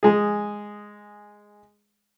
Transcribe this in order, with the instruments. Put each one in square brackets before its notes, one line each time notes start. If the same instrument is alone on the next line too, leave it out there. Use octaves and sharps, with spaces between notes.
[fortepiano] G#3 G#4